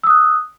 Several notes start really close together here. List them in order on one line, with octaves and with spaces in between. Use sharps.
E6 D#6 F#6